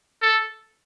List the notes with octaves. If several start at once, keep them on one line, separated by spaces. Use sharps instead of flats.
A4